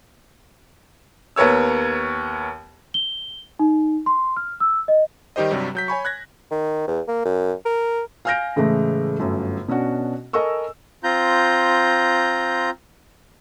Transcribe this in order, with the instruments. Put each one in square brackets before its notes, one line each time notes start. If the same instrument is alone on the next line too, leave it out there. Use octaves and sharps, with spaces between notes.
[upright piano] D#2 B3 A#4 C#5 E6
[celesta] G7
D#4
C6
F6
E6
D#5
[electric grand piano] D#3 G3 D#4 G4 C5 D#5
G2 C3 F#3 G3
F#3 G6 B6
C#5 G#5 B5 C#6
F#6 G#6 A#6
[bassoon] D#3
E2
A#3
F#2
A#4
[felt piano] F5 G#5 F6 G6 A#6 D7
A2 C#3 E3 G#3 A3
G1 F#2 A3
B2 C#4 D4 F#4
A4 A#4 D#5 G#5 C#6 E6
[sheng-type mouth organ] C4 F4 A#5 G6